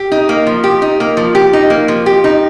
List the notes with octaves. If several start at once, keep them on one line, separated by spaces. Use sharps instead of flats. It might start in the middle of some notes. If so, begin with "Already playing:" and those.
Already playing: G4
D#4
A#3
F3
G4
D#4
A#3
F3
G4
D#4
A#3
F3
G4
D#4